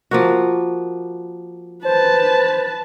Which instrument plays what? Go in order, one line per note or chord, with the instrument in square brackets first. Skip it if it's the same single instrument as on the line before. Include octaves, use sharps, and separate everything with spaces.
[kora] F3 A#3 F#4
[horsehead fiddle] B4 A5 [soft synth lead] C5